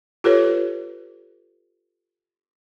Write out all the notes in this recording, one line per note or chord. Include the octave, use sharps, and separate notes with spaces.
F4 G4 A4 B4 C#5